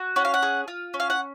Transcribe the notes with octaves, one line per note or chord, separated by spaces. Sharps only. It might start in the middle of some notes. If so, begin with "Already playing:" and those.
Already playing: F#4
C#4 F#5
F5
F#5
G#4
F4
C#4
F5
F#5